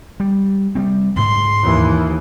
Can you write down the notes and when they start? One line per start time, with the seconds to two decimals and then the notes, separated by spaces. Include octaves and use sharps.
0.20 G3
0.75 G3 A3 C4
1.16 D2 G#2 C6
1.62 D#2 E3